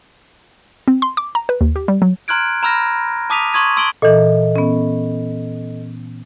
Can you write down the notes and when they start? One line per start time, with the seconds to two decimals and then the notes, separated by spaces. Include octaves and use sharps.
0.88 C4
1.02 C6
1.17 D6
1.35 A#5
1.49 B4
1.61 D#2
1.76 G4
1.88 G3
2.02 F#3
2.28 A#5 C6 F6 F#6 G#6 D7
2.63 A#5 B5 E6 F6 A#6
3.30 A5 D6 D#6 B6 D#7 F7
3.54 C6 C#6 D#6 G#6 D#7
3.77 C6 E6 D7 F#7 G7
4.02 A#2 E3 A4 D#5
4.56 B3 C#4